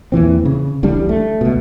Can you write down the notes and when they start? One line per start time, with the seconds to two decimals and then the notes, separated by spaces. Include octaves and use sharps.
0.12 E2 A#2 E3 C4
0.45 C#3
0.83 D1 A1 G3 D4
1.09 A3
1.41 C#2 B2